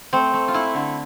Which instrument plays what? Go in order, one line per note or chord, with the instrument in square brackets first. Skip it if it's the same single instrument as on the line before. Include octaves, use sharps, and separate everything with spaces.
[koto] A3 C4
A3
F4
A3 E4
D3